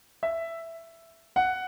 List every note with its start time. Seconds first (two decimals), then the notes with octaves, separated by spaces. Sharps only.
0.23 E5
1.36 F#5